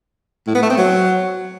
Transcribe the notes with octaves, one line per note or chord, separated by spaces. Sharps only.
A2
B3
A3
C4
F#3